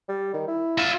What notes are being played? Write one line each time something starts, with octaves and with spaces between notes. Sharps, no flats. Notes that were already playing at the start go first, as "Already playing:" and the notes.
G3
D#3
E4
F4 E5